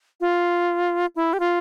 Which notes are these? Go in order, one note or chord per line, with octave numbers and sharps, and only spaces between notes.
F4
E4
G4
F4